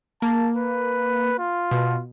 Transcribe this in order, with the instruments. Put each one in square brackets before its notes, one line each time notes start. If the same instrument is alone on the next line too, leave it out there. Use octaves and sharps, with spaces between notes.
[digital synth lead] A#3 [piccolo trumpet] A5
[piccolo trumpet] B4
F4
[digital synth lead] B2